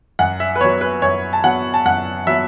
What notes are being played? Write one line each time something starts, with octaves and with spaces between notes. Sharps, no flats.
F#2 F#5
E5
B4
F#3 B3 C#5
B4
F#2 C#5
A5
F#3 B3 F#5
A5
F#2 F#5
F#3 B3 E5